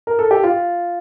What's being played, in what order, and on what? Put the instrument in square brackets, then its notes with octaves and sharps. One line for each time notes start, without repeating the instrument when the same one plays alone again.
[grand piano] A#4
A4
G4
F4